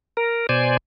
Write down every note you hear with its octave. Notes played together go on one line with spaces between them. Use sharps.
A#4
B2 C5 D5 G#5